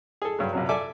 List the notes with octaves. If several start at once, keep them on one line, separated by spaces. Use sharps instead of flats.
G#4 A4
G2 F#3
A#1 C3 F#3
A4 D5 E5 G#5 D6